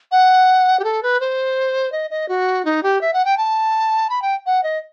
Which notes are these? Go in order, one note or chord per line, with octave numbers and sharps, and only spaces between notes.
F#5
G4
A4
B4
C5
D#5
D#5
F#4
D#4
G4
E5
F#5
G5
A5
B5
G5
F#5
D#5